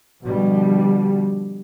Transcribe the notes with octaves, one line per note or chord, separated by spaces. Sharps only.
B2 D3 F3 G3